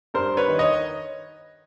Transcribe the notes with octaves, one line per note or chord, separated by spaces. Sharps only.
G2 A#4 C5
B4 C#5
D#3
C#5 D#5